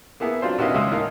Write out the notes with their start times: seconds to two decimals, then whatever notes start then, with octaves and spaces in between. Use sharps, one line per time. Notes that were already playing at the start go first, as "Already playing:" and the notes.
0.20 A#3 B3 E4 G#4
0.42 F#3 C4 D4 F4 C5
0.58 B2 D#3 C#4 E4 D#5 F5
0.74 C#2 G#3 E5 F5 C6 D#6
0.91 A2 D#3 A#3 D#5 F5